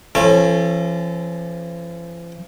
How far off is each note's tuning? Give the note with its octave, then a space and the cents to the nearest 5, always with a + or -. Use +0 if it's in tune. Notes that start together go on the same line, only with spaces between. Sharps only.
F3 -45 C#4 -30 A4 +0